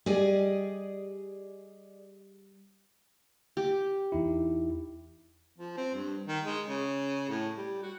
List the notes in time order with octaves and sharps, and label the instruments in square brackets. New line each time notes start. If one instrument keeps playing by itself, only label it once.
[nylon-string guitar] G3 G4 [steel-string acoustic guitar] G#4 D5 D#5
[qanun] G4
[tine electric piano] E2 D#4 E4
[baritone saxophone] F3
C4
G2
D#3
G#3
C#3
A2
G3
F#4